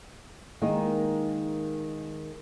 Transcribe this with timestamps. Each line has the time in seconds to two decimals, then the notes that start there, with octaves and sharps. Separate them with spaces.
0.62 D#3 G#3 A#3 D#4